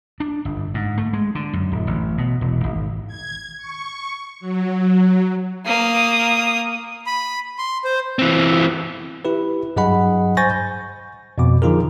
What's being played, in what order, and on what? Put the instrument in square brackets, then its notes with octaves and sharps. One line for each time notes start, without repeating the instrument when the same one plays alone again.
[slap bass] D4
G1
G#2
A3
G#3
D3
F#2
D1
A1
B2
E1
G#1
[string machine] G#6
C#6
F#3
[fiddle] A#3 D#6
[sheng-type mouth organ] B5
C6
C5
[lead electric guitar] E3 C4
[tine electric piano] E4 G4 B4
G2 F#3 G#4 D#5 F#5 B5
C5 G#5 C#6 G6 A6 A#6
G6
F2 B2 D6
D3 F3 D#4 F4 G#4 A#4